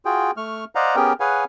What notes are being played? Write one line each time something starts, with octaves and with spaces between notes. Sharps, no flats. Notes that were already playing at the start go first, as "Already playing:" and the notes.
F4 F#4 G#4 G5
A3 C#6 F6
C5 D5 D#5 F5 F#5 A#5
B3 C#4 G4 G#4 A#4 G5
G#4 B4 C#5 F5 F#5 G#5